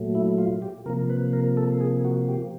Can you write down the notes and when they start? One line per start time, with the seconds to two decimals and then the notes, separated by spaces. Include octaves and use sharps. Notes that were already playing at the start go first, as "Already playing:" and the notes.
Already playing: A#2 F#3 A3
0.15 E4
0.38 F4
0.62 G4
0.86 C3 F3 A#3 A#4
1.10 B4
1.33 A#4
1.57 A4
1.81 G#4
2.05 F#4
2.28 G4